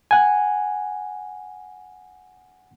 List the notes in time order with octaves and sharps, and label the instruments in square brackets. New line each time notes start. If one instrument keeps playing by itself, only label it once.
[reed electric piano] F#5 G#5